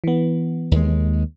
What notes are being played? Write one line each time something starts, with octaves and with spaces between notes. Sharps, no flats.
E3 B3
D#2 G#3